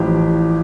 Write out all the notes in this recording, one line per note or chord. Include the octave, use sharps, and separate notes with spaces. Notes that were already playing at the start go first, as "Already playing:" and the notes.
Already playing: A1 A2 F3 G4